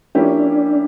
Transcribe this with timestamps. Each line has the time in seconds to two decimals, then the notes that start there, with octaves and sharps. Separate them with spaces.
0.15 F3 A#3 C#4 D4 E4 G4